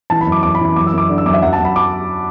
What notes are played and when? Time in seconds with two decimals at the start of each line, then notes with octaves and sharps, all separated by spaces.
0.10 E3 A5
0.21 B5
0.26 F#2
0.32 D6
0.43 F#2 D6
0.55 B5
0.60 E3
0.65 B5
0.76 F#2 D6
0.87 E6
0.92 F#2
0.98 D6
1.09 D3
1.18 E6
1.26 F#2 D6
1.34 E5
1.42 F#2 F#5
1.53 A5
1.59 F#2
1.65 B5
1.76 D6